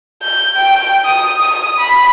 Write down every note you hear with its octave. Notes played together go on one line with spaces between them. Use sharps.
G6
G5
D#6
D#6
B5